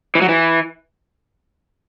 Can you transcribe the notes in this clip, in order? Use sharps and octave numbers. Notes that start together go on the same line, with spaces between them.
E3
F#3
E3